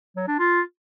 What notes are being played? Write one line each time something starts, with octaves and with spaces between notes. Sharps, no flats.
F#3
D4
F4